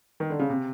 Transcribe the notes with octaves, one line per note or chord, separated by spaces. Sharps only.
D#3
D3
C#3
C3